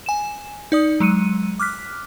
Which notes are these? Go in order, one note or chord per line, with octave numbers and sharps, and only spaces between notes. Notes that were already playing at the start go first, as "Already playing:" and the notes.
G#5 E7
D#4 D5 D#6
F#3 G#3 C#7 D#7
D6 F6 F#6 B6